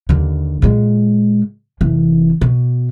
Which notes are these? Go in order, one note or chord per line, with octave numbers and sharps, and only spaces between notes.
D#2 D3
A#2 G#3
F1 E3
B2